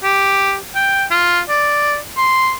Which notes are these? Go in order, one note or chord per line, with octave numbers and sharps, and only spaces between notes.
G4
G5
F4
D5
C6